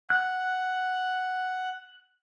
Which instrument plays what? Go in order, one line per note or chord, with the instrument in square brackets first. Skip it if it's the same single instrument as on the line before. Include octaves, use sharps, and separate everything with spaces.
[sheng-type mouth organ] F#5 [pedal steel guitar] F#6